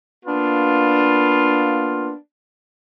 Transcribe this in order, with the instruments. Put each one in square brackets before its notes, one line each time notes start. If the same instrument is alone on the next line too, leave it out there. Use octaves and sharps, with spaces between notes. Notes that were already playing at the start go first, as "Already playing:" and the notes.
[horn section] A#3 B3 D4 F4